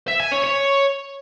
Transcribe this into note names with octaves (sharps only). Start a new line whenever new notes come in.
E5
G#5
C#5
C#5